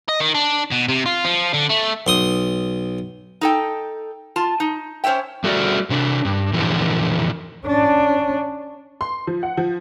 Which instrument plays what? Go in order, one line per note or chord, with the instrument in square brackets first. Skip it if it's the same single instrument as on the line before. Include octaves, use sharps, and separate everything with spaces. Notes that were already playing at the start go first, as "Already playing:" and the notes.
[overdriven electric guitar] D#5
D#3
D4
B2
C3
F4
F3
D3
A3
[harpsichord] B1 C6 D#6
[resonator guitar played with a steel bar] D#4 A4 G5
F4 A5
D#4
C#4 C5 C#5 E5 G5
[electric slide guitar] G3 A3 F#4 A4 D5
C3 D4
G2
F2 A#2 D3 E3 F3
[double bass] C#4 D4
[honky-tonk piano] C6
F3
F#5
F3